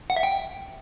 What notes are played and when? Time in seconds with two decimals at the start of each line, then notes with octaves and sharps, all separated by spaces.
0.10 F#5
0.16 E5
0.23 G5